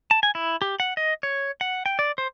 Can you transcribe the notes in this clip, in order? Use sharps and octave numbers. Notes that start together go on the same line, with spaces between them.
A5
G#5
E4
G4
F#5
D#5
C#5
F#5
G5
D5
C5